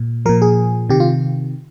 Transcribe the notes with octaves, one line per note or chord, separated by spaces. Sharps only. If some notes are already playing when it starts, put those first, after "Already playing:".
Already playing: A#2
A#2 F3 A#4
G#4
C3 D#3 G4
F4